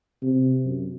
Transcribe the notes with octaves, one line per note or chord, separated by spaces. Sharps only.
C3
F#2